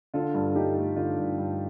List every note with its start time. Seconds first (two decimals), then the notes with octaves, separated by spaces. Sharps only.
0.14 D3 F4 A4
0.34 G2
0.55 G2 D#4 G4
0.76 A3
0.96 D3 F4
1.18 G2
1.38 G2